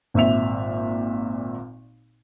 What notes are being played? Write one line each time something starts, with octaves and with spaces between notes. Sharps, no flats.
G#1 A#2 E5 F7